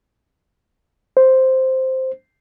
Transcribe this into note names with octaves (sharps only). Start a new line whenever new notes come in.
C5